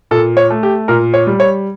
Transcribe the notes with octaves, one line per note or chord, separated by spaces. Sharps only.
A#2 A4
C#5
A3
G4
A#2 A#4
C#5
G3
C#5